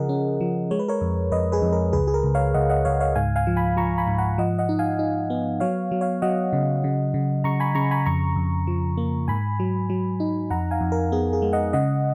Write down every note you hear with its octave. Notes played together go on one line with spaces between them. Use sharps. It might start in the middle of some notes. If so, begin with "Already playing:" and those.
Already playing: C#3 F3 G#4 A#4 D#5 F#5
C#4
F3
G#3 C#5
B4
A#4 C#5
F2
F2 B4 D#5
G#4 B4
F2
A#4
C#2 G#4 B4
G#4
A#4
C#2
C#5 F5
C#2 D#5 F#5
D#5 F#5
C#2 C#5 F5
C#5 F5
G#2 F5 G#5
F5 G#5
F3
G#5 B5
F3 A#5 C#6
G#5 B5
G#2
F#5 A#5
F3 D#5 F#5
D#5 F#5
D#4
F5 G#5
D#4
B3
F#3 C#5 F5
F#3
C#5 F5
F#3 D#5 F#5
C#3
C#3
C#3
C#3 A#5 C#6
G#5 B5
C#3 A#5 C#6
G#5 B5
F2 A#5 C#6
F2
F3
A#3
G#2 G#5 B5
F#3
F#3
D#4
F2 F#5 A#5
F5 G#5
F2
A#4
B3 G#4
G#4
G#3
D#5 F#5
C#3 D#5 F#5